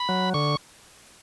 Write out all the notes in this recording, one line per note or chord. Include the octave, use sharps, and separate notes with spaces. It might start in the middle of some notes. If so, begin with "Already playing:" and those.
Already playing: B5
F#3
D3 C#6